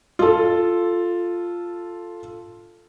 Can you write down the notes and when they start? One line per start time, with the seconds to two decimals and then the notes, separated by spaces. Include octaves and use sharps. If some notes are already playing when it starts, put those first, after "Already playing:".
0.19 F4 A4